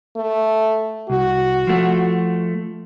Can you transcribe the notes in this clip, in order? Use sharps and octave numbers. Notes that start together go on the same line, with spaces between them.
A3
C2 F#4
F3 A3